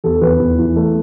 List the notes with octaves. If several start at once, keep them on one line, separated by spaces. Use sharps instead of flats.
E2 A4
E2 B4
E2
E3
A3